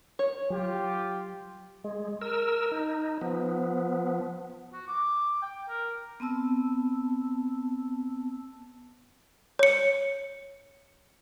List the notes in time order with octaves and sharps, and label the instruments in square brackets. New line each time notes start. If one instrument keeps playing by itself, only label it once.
[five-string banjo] C#5
[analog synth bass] F#3 [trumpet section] F4 G4
[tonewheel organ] G#3
A#4 E6
D#4
F3 B3
[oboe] F#4
D6
G5
A#4
[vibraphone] B3 C4 A5 E6
[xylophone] C#5 C#7